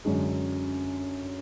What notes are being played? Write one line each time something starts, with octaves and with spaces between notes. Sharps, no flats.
F#2 D3 G#3